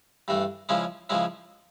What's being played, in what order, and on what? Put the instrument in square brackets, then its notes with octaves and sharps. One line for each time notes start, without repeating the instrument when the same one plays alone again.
[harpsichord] G2 E3 A3 D4
C#3 F3 G#3 C#4 E4
C#3 F3 G#3 C#4 E4